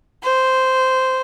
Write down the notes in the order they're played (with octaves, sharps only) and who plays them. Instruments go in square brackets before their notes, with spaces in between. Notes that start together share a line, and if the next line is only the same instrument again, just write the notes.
[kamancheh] C5